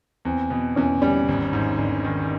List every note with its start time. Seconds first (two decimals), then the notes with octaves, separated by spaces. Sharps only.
0.25 E2 C4
0.50 B2
0.76 E2 C#4
1.02 G3 C#4
1.28 G#1
1.53 G#2
1.78 G#1 D4
2.05 D#3